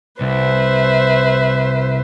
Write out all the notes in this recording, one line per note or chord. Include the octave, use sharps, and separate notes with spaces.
C2 B4 C5 E5